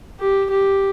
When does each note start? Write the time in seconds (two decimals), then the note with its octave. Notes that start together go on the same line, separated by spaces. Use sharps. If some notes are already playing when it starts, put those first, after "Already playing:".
0.20 G4
0.51 G4